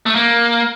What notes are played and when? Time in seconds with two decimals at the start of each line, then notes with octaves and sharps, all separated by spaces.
0.06 A3
0.15 A#3